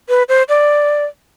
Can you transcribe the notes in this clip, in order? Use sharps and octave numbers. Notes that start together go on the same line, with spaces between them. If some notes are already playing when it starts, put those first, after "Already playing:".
B4
C5
D5